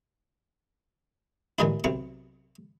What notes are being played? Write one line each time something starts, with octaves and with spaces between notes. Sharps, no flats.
A1 A#2 E3 G#3 D#4 E4
B1 C3 C#6